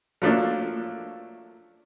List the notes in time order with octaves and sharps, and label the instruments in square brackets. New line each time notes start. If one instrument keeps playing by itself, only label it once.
[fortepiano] F3 F#3 A3 A#3 D4 F4